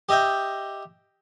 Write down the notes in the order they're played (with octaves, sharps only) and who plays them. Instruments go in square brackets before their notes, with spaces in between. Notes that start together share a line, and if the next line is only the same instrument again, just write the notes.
[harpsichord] G4 D#5 E5 G5